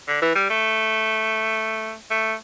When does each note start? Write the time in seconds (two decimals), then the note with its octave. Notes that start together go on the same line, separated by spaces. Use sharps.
0.08 D3
0.22 E3
0.36 G3
0.50 A3
2.11 A3